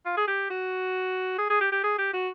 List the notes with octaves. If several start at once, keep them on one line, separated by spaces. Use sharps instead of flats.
F4
G#4
G4
F#4
G#4
G#4
G4
G4
G#4
G4
F#4